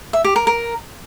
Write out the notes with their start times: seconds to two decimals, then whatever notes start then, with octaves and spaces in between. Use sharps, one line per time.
0.13 E5
0.24 G4
0.36 A#4
0.47 A#4